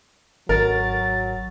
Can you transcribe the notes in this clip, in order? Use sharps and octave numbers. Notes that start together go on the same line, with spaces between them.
G#1 F#3 A#4 A6